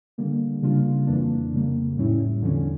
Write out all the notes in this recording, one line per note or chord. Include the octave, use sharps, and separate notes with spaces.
D3 G3 A#3
C#3 G3 A#3 D4 F4
F2 E3 A#3 D4
F2 C#3 G3 A#3
A2 G3 C#4 E4
E2 D3 F3 C#4